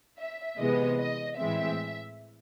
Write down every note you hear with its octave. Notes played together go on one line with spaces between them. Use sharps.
E5
C3 E3 G#3 B3 D#5
D#5
A2 E3 G#3 C4 E5